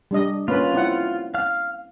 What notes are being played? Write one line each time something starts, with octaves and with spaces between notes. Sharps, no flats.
G3 D4 D#5
A#3 C#4 F4 B4
C4 E4 F#5
F5 F6